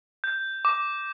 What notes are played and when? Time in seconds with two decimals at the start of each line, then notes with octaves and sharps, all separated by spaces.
0.24 G6
0.65 D6